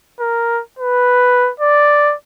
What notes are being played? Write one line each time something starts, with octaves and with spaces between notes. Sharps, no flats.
A#4
B4
D5